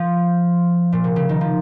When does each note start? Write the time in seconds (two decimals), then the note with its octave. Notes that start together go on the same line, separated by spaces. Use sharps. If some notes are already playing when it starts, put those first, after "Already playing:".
Already playing: F3
0.93 A#2
1.04 C3
1.16 C#3
1.29 D#3
1.41 F3